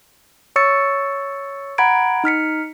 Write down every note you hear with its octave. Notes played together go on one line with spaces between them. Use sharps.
C#5 C#6 E6 A6 C#7
F#5 A#5 B5 G#6 D7
D#4 F6 B6 C#7